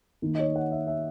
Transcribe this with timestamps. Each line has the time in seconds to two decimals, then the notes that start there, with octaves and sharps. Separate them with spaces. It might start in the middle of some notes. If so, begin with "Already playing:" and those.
0.22 D#3 A#3
0.35 D#5
0.39 C#5
0.56 F#5
0.72 E5
0.87 E5